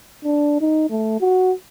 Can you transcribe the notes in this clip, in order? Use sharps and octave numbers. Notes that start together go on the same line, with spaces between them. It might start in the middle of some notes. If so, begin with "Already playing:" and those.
D4
D#4
A3
F#4